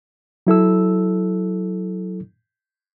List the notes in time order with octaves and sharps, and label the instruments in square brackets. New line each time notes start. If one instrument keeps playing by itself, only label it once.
[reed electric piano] F#3 E4 A4 E6